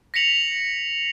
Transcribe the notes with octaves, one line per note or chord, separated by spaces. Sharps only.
A#6 B6 C#7 F7 F#7